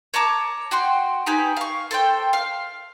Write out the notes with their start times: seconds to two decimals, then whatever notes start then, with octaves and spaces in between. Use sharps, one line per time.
0.14 C#5 A5 A#5 D6
0.71 F#4 G5 C6
1.26 D#4 G4 B4 G#5
1.57 F5 C#6
1.91 A4 C5 G5
2.33 F5